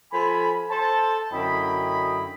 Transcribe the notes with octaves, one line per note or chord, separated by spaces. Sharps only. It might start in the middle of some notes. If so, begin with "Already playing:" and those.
F3 A4 G#5 B5
A4 C5 A5
F#2 D3 E4 D#5 G5 B5